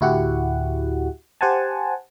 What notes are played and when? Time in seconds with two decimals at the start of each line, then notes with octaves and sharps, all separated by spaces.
0.01 D2 A2 E4 F#4 G4 F#5
1.41 G4 C5 F#5 G#5 A5